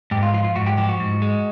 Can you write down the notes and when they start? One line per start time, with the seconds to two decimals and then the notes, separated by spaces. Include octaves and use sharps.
0.11 G#2 G4
0.23 F4
0.34 F3 F4
0.44 F4
0.56 G#2 F#4
0.66 G4
0.78 F3 G4
0.89 F#4
1.00 G#2
1.22 G#3